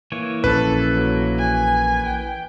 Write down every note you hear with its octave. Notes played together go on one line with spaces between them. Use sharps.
E3 A#3 C#5
A#1 C#4 A4 B4
F#3
G#5
G5